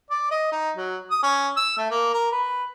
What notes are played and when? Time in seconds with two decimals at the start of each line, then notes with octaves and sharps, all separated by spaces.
0.10 D5
0.31 D#5
0.52 D#4
0.76 F#3
1.11 D#6
1.23 C#4
1.57 E6
1.77 A3
1.90 A#3
2.13 A#4
2.32 B4